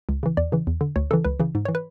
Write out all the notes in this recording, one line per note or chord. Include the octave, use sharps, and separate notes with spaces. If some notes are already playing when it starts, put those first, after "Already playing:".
C#2
C#3 E3
E2 D5
C#3 E3
E2
D3
D2 C#5
C#3 E3 A4
C#2 B4
C#3 E3
G#2
E3 C#5
B4